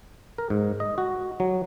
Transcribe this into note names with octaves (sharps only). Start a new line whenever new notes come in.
A#4
G#2
D#5
F#4
F#3